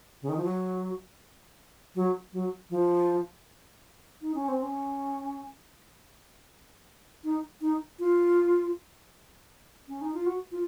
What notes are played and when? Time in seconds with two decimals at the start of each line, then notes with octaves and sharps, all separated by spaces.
0.22 C#3
0.29 D#3
0.37 F3
0.44 F#3
1.95 F#3
2.33 F#3
2.70 F3
4.22 D#4
4.35 C#4
4.48 C4
4.62 C#4
7.24 D#4
7.61 D#4
7.99 F4
9.88 C#4
10.01 D#4
10.14 F4
10.26 F#4
10.52 F4